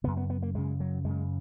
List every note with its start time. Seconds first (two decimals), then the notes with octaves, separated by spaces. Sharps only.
0.04 F#2 C#3 B3
0.17 B3
0.30 B3
0.42 A#3
0.55 F#2 C#3 G#3
0.80 F#3
1.04 F#2 C#3 G#3